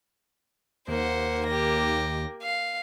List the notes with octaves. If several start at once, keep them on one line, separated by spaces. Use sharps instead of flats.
D#2 A#3 C5 F#5
G4 A#6
F5